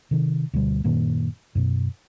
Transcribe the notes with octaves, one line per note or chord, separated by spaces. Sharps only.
C3 D#3
D2 B2 G3
F#2 A#2 D#3 A#3
F#2 B2